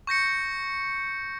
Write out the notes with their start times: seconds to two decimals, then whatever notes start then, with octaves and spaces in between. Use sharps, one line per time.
0.07 C#6 G6 A#6 C#7